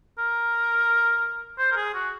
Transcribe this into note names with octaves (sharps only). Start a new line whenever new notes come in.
A#4
C5
A#4
G#4
F#4